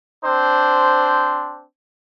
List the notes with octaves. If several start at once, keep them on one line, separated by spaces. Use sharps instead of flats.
C4 D4 C5